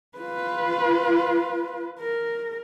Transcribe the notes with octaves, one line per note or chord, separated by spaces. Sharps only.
F4 B4
A#4